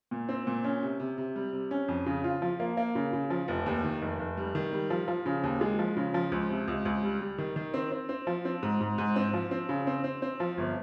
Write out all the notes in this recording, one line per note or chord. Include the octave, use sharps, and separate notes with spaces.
A#2
C4
A#2
C#4
C3
C3
C3
G3
C3
C#4
F2
C#3
F4
F3
A#3
A#3
C#3
C#3
F3
F1
D#2
D#3
F1
F1
G3
D#3
G3
F3
F3
C#3
D#2
G#3
F3
C#3
F3
C#2
C3
C#2
C#2
G3
G3
D#3
D#3
C4
C4
C4
F3
C4
G#2
G#2
G#2
C4
F3
C4
C#3
C4
C4
C4
F3
G1